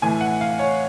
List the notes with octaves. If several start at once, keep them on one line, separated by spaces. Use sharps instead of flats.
A2 E3 A3 G#5
F#5
F5
C#5